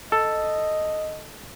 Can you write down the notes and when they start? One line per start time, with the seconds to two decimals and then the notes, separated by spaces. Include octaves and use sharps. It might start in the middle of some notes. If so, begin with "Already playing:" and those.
0.12 A4 D#5